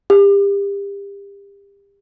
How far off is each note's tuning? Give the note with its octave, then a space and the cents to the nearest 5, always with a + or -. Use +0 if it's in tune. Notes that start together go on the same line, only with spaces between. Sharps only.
G4 +30